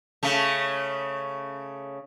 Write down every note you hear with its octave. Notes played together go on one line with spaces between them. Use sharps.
C#3 A3